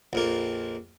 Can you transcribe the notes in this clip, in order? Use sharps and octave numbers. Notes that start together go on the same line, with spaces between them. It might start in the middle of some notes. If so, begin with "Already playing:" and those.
A#1 F2 A#3